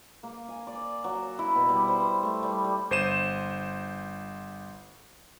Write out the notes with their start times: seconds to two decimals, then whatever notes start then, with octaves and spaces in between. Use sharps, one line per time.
0.23 A#3
0.48 G#5
0.67 D5
1.04 F#3
1.39 E4
1.55 B2
1.69 G3
1.88 C5
2.23 A3
2.43 G3
2.64 G3
2.91 G1 C5 D#7 E7